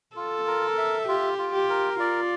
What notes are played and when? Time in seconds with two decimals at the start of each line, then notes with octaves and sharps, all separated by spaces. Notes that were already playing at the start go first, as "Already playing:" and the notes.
0.16 F4 A4
0.47 A#4
0.78 E5
1.08 F4 G4
1.38 F4
1.53 G4
1.70 A#4
2.00 F4 D5